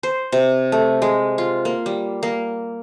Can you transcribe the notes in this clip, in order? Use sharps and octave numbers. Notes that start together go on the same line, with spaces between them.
C5
C3
A3
G#3
F4
A#3
G3
A#3